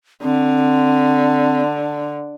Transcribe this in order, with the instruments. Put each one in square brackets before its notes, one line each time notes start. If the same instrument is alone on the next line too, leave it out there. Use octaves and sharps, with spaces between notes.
[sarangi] D3 [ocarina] C4